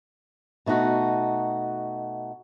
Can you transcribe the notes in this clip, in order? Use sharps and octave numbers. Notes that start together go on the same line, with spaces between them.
B2 A3 D#4 F#4